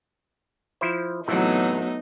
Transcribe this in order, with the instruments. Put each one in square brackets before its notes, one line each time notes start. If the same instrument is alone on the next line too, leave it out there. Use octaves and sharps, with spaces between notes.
[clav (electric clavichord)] F3 E4 C5
[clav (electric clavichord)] A2 C3 E3 [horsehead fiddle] F#3 A3 [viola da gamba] B3 D#4